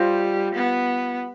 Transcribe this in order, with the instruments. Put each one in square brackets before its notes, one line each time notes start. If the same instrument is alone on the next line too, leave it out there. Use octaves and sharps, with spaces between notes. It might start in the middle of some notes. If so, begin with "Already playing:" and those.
Already playing: [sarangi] G3 [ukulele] F4 C5 D#5
[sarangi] B3